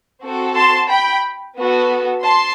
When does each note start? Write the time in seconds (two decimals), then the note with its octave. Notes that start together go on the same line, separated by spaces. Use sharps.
0.22 C4 F#4 A4
0.56 A5 C6
0.90 G5 B5
1.57 B3 F#4 A4
2.24 A5 C6